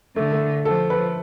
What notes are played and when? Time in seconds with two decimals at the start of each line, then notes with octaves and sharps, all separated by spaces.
0.16 D3 A3
0.32 A3
0.65 F3 A4
0.90 B4